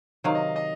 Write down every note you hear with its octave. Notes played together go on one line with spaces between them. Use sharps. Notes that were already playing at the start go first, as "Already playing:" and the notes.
C3 D#3 F#3 F5
D#5
D#5